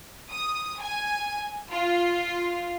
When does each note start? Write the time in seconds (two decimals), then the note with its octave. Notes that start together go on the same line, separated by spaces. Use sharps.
0.29 D#6
0.79 G#5
1.70 F4